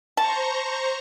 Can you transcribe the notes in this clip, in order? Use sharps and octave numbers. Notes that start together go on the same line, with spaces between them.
C5 A5 A#5 C#6